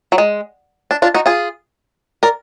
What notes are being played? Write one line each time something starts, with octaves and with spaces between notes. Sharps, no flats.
F#3
G#3
D4
D4 F4
D#4 F#4
F4 G#4
A#4 D5